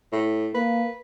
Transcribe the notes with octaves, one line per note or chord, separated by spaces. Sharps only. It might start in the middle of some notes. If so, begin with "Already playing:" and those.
A2
A#3 B4